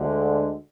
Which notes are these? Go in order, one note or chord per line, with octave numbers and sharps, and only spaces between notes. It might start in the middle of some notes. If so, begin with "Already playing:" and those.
Already playing: D2 D3 G#3